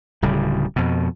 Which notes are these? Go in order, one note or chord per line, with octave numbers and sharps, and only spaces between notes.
D1 C#3 G3
F2 B2